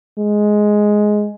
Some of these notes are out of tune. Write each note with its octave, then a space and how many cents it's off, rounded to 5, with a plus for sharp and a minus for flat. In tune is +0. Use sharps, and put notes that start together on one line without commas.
G#3 +5